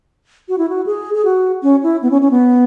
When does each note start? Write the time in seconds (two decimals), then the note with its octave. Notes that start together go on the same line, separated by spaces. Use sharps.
0.49 F#4
0.58 E4
0.69 F#4
0.86 G#4
1.14 G#4
1.25 F#4
1.63 C#4
1.83 E4
2.02 B3
2.11 C#4
2.21 C#4
2.31 B3